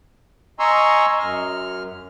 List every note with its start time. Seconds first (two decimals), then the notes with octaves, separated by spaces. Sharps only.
0.59 D#5 G#5 A#5 C6 C#6 E6
1.19 F#2 F6